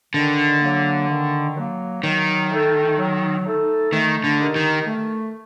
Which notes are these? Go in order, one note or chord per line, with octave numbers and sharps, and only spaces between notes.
D3 D#3
F#3 A#3
D#3
F#3 A#3
D#3 F#3
A3 D#4 A4
F#3
A3 D#4 A4
D#3 A3
D3
D#4 G4 A#4
D#3
A3